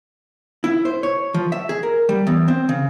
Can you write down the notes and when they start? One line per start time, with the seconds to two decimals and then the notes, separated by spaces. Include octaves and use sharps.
0.64 E4
0.85 C5
1.03 C#5
1.34 F3
1.52 E5
1.69 G#4
1.83 A#4
2.09 G3
2.27 E2
2.48 C4
2.69 C#3